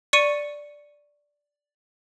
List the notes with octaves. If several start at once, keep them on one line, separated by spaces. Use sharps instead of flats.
D5 C#6 C#7 D#7